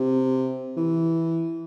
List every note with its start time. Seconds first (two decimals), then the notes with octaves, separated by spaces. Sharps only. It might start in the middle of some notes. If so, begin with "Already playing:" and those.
Already playing: C3
0.76 E3